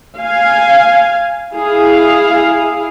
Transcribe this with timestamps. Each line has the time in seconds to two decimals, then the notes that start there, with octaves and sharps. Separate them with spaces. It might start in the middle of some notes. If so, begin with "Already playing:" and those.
0.18 F5 G#5
1.55 E4 G#4 F5